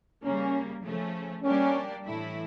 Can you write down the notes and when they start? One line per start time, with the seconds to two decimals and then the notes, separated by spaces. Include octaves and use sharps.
0.23 C#3 G3 A#3 C#4
0.84 C#3 F3 A3 C#4
1.43 G3 A#3 C#4 D4 G4 D5
2.04 A2 E3 A3 E4